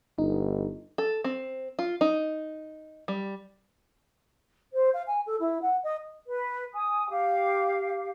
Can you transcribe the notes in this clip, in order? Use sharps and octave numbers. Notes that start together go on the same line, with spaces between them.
G1 D#4
A4
C4
F4
D#4
G3
C5
F5
G#5
A4
E4
F#5
D#5
B4
G#5 D#6
G4 F5